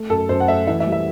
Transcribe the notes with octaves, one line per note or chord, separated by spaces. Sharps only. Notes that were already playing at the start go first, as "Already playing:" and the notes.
Already playing: A3
F#2 A4
F#2 C5
F#5
A3 E5
E3 E5
E5
G3
E5